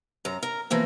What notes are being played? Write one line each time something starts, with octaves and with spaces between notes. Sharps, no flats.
F#2 A#5
A#4
E3 F3 A#3 B3